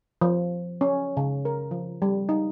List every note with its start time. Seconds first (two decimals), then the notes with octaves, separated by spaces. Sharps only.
0.21 F3
0.81 C#4
1.17 C#3
1.45 A#4
1.71 F3
2.02 G3
2.29 D#4